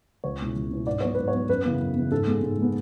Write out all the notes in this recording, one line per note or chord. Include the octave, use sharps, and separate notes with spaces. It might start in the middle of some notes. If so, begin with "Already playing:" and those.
C#2 C#5
B2 G#3 C#4 E4
C#2
B2 G#3 C#4 E4
G#2 D5
F#3 B3 C#5
G#2 B4
C#5
F#3 B3
F#2 B4
C#3 E3 B3
F#2
C#3 E3 B3
G#2 A4
G#3 B3
G#2
G#3 B3